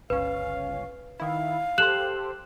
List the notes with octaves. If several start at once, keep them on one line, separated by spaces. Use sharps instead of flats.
G1 C#2 C#4 B4 F5
D#3 E4 F5
G4 A4 C5 F#6 E7 F#7